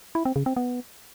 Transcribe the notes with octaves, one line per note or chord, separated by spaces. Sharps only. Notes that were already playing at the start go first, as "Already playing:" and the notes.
E4
C4
C#3
C4
B3